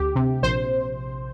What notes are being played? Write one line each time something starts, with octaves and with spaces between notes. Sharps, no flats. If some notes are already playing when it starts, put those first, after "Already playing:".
Already playing: D2 G4
C3
A#1 C5